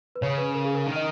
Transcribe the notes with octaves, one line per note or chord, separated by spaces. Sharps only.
B4
C#3 C#5
B4
A#4
G#4
A#4
D#3
D#5